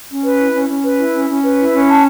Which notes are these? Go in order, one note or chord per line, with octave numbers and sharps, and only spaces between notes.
C#4
B4
E4
C#4
C#4
B4
E4
C#4
C#4
B4
E4
C#4
A5